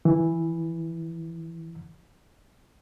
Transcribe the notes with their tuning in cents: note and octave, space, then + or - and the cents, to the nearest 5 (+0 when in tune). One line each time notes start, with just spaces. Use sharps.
E3 +0